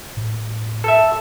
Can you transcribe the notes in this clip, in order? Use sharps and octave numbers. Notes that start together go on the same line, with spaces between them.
A2
A4 E5